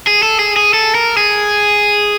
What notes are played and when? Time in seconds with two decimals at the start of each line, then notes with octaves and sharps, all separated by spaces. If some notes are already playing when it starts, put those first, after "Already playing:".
0.07 G#4
0.23 A4
0.39 G#4
0.56 G#4
0.74 A4
0.95 A#4
1.17 G#4